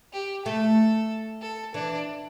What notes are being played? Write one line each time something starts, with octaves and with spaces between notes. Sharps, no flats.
G4
A3 A4
A4
E3 D4